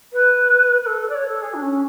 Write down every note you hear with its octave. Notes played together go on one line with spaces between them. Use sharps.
B4
B4
A4
A4
D5
C#5
A4
G#4
D4
C#4